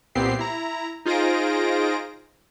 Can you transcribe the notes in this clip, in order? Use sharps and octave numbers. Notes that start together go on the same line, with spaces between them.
C2 A#2 B3 C4 G4 C7
E4 A#5
D#4 F4 G#4 C5 A#6 D7